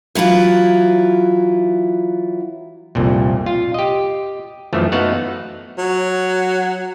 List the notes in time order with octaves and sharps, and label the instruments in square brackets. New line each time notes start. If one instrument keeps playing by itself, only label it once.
[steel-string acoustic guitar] E3 F#3 E4 F4
[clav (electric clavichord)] C2 F2 A#2
F4
G4 D#5
F#2 E3 F3 A3
A3 B3 D#4 F#4 F5 F#5
[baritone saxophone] F#3